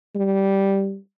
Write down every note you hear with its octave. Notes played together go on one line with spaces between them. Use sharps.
G3